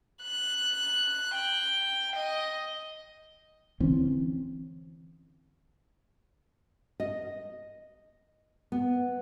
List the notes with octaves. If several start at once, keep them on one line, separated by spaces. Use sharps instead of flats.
F#6
G5
D#5
D3 E3 C4 C#4
D#5
B3